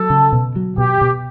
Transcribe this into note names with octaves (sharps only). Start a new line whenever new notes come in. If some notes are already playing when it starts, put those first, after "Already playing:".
Already playing: F#3 A4
C#3
B2
F#3
B2 G4
B2